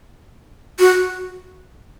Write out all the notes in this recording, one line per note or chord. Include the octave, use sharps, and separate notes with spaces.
F#4